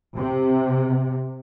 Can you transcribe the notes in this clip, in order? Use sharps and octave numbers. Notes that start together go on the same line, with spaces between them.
C3